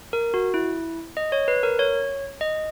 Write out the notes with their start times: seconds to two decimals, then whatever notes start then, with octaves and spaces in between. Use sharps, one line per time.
0.13 A#4
0.34 F#4
0.54 E4
1.17 D#5
1.32 C#5
1.48 B4
1.63 A#4
1.79 C#5
2.41 D#5